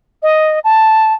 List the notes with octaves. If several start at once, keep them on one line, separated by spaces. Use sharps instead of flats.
D#5
A5